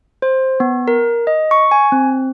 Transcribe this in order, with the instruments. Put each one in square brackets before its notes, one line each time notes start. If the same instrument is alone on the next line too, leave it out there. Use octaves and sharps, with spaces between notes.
[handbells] C5
B3
A#4
D#5
C#6
G#5
C4